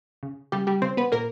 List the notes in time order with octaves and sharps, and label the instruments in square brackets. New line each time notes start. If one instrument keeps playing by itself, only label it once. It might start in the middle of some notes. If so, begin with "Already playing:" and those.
[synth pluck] C#3
C#3 G3 G4
G3 G4
C#3 C4 C5
B3 B4
A#2 A#3 A#4